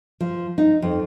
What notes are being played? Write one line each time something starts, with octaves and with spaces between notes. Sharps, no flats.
F3
D#4
F2